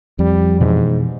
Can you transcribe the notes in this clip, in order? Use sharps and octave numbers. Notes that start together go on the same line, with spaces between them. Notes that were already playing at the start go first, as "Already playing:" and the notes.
F2 G3
G#2 B2 E3